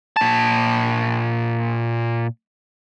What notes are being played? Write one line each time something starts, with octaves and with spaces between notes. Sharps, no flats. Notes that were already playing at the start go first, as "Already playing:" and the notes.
A#2 A5